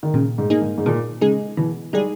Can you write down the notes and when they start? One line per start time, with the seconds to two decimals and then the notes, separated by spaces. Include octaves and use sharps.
0.03 D#3
0.14 A#2 C#3
0.38 G#2
0.50 A#3 D#4 G#4
0.62 G#2
0.78 G#2
0.86 A#2 D#3
1.21 C#3 G#3 D#4 G#4
1.57 B2 E3
1.93 G3 G#3 D#4 G#4